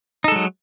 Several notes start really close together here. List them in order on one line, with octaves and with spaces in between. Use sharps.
D#4 A4 G#3 F#3